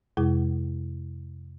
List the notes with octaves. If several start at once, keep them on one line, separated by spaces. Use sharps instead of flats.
F2 C3 G#3 E4 G#4